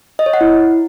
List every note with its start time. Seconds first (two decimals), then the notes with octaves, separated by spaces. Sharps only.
0.19 D#5
0.26 C#5
0.33 F#5
0.41 E4